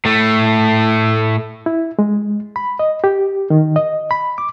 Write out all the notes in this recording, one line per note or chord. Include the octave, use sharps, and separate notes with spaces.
A2 A3
E4
G#3
B5
D#5
G4
D#3
D#5
B5
D6